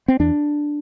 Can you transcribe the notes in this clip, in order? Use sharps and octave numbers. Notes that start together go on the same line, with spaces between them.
C4
E2 D4